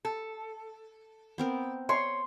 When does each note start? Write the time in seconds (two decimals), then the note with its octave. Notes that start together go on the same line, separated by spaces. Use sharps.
0.05 A4
1.38 B3 C4 A#4
1.89 C#5 C6